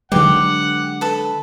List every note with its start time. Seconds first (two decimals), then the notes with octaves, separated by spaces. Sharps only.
0.12 D3 F#3 G#3 G4 B4 F#5
1.01 A4 B4